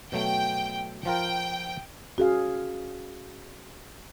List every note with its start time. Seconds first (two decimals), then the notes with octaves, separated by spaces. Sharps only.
0.12 B2 F#3 A3 G5
1.05 F3 F4 A#4 G5
2.18 C#4 F#4 G#4 F5